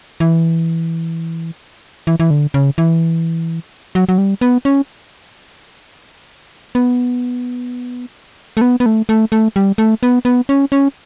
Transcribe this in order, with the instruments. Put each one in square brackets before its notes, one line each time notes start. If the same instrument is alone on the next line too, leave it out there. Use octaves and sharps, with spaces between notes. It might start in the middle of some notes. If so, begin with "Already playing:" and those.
[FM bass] E3
E3
E3
D3
C#3
E3
F#3
F#3
G3
B3
C#4
B3
A3
B3
B3
A3
A3
A3
G3
A3
B3
B3
C#4
C#4